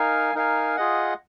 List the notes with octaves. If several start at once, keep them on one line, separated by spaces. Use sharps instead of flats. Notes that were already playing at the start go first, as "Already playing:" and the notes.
Already playing: D#4 A#4 F5 G#5
D#4 A#4 F5 G#5
F4 G#4 D#5 F#5